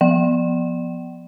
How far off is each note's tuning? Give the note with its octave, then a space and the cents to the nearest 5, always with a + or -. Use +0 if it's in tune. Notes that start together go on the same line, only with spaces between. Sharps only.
F3 +0 G5 -45